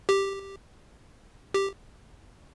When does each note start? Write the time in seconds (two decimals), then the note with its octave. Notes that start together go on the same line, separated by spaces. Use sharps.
0.09 G4
1.54 G4